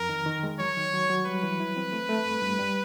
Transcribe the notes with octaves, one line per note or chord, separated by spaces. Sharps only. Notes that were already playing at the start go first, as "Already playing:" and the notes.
Already playing: F2 A#4
D#3
D#3
G#3
F#3 C#5
D#3
F#3
F#3
G3 B4
E3
E4
C4
A3
A3
G2
G2
G3